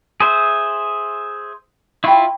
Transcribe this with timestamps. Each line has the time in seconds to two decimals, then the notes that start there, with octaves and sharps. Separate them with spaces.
0.20 G#4 C5 E5
2.04 E4 F4 G5 B5 C#6